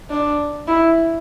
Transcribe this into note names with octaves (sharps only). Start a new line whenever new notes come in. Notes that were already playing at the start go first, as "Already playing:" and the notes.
D4
E4